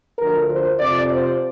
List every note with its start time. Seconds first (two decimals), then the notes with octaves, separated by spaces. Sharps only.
0.19 D2 D3 F3 A#4
0.50 C5
0.80 F2 C3 F3 D5
1.10 C5